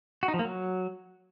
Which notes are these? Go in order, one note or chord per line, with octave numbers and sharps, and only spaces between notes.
F#4
D#4
F3
A#3
F#3